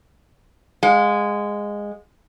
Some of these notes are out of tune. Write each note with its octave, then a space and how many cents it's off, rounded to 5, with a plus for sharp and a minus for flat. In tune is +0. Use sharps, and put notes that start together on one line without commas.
G#3 -10 F5 +35